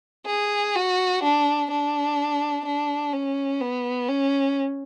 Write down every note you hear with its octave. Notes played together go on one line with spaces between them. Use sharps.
G#4
F#4
D4
D4
D4
C#4
B3
C#4